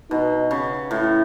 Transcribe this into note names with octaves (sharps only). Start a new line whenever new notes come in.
B2 D#4
C#3
A2 E4